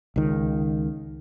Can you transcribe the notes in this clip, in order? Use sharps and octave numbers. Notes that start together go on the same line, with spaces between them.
C#2 D#3